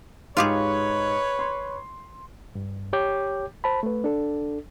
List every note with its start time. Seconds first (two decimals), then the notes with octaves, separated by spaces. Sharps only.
0.37 G#2 F4 G4 G#4 B4 C#5
1.39 C6
2.55 G2
2.93 G4 C#5 G5 D6 G6
3.64 C5 A5 B5
3.83 A3 B4
4.04 D4 A4